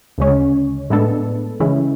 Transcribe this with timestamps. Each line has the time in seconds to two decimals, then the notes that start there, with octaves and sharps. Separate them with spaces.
0.18 D2 C#3 G#3 C#4
0.90 A2 G#3 B3 D4 A4
1.60 C#3 E3 G#3 C#4 E4